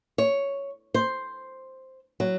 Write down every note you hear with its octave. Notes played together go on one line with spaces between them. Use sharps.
C#5
C5
F#3